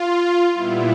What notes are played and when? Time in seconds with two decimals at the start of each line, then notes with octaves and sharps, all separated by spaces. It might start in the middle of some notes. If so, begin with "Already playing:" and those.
Already playing: F4
0.52 A#2 G3 B3 E4